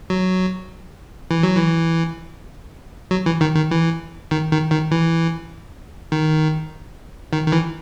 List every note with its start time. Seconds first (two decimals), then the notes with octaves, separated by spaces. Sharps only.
0.10 F#3
1.31 E3
1.43 F#3
1.57 E3
3.11 F#3
3.26 E3
3.41 D#3
3.56 D#3
3.71 E3
4.31 D#3
4.52 D#3
4.71 D#3
4.91 E3
6.12 D#3
7.33 D#3
7.47 D#3
7.52 E3